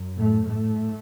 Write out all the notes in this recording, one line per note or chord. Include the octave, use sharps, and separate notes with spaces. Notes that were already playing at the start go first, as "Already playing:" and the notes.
Already playing: F#2
A2 A3
A2 A3